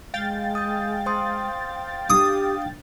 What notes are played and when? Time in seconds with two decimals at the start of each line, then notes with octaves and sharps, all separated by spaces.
0.14 G#3 F5 G5 A6
0.55 D#6 G6
1.06 C5 C6 D#6
2.10 D4 G4 D#6